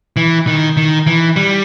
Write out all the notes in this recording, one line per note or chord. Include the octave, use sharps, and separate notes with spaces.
E3
D#3
D#3
E3
G3